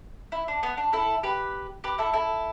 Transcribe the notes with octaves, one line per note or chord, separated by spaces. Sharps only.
E4
D4
B3
D4
E4 A4
G4 B4
G4 B4
E4 A4
E4 A4